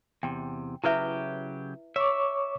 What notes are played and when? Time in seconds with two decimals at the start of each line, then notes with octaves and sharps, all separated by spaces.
0.23 E2 C3 G5
0.84 C#3 F#3 E4 G4 B4 E5
1.96 C#5 E5 C#6 D6